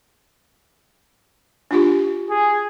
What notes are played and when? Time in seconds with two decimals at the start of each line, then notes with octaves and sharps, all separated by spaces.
1.71 D4 F4 G4
2.30 G#4